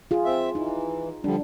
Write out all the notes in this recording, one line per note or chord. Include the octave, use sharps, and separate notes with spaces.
F4 G#4
C4 E5
E3 D#4
D3 F3 G3 D4